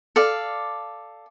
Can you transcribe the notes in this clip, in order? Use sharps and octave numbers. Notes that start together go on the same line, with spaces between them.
A4 D5 F5